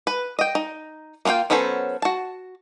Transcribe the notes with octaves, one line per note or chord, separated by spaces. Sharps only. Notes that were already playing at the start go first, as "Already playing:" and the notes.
B4
D#5 G5
D#4
A#3 B3 F4 F5 G5
F#3 B3 C#4 A4 C5
F#4 A5